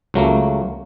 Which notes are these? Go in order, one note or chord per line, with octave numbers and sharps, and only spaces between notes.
C#2 F#3 A3 A#3